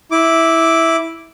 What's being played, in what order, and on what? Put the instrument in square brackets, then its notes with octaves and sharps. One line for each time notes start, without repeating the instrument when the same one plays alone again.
[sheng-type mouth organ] E4 D6